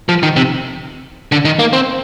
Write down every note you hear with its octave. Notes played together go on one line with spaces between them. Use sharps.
F3
D#3
C3
D3
D#3
A#3
C4